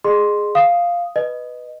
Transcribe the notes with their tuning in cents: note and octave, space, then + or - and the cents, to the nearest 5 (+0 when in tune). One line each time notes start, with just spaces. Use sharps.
G#4 +0 D#5 -35 C6 +0
F5 +0 D#6 +0
B4 +0 D#5 -10